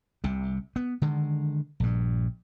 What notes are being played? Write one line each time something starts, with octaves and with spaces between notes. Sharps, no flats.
C2 C3
B3
D3 D#3 G#3
A#1 G2